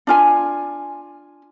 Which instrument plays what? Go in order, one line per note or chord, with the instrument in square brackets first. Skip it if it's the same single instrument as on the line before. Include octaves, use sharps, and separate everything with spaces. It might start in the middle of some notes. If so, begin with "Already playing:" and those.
[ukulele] D4 F4 G#5